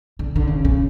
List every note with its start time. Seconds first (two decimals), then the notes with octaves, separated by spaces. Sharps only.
0.19 D3
0.36 D3
0.47 C#3
0.65 C#3